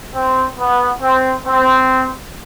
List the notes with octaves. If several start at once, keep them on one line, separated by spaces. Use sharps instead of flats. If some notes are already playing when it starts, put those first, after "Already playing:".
C4
B3
C4
C4